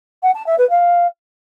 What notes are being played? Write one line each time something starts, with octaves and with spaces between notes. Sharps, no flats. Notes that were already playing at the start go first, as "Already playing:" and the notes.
F#5
A5
E5
B4
F5